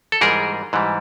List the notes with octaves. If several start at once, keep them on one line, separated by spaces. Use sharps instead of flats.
A4
G#2 E3 G3 G#4 A#4
G#2 E3 G3